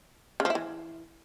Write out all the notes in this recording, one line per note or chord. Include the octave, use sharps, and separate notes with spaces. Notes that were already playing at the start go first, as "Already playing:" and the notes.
C#3
F3
E4
E3